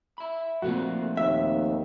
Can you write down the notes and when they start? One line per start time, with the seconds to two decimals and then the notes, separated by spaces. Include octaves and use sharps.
0.18 E5 B5
0.62 A#2 F3 A3 C4 F#4
1.17 D#2 E5